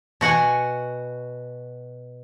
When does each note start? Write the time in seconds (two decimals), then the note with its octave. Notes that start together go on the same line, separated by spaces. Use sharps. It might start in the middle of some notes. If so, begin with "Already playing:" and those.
0.21 B2 F#4 F#5 G#5